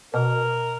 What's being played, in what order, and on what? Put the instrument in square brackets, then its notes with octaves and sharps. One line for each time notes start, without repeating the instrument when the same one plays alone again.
[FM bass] B2 [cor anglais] A#4